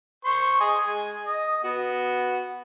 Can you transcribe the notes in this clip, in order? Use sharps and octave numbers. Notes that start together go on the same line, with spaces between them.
C5 C6 C#6
G#4 D#5 G#5
G#3 G#5
D#5
B3 F#4 F#5